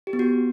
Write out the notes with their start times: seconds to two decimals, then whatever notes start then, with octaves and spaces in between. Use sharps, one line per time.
0.07 G4
0.13 B3
0.19 F#4